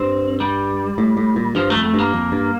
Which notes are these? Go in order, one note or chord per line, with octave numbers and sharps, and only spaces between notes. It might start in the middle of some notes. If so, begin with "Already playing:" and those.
Already playing: G2 C4
G3
A2
A2
A#2
G2 F3
A3
F2
A3
G2 A#3
F2
G2